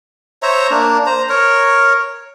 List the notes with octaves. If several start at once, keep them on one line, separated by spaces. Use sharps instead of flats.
C5 C#5 E5 A#5
A#3 D4
C5 A#5
A#4 C#5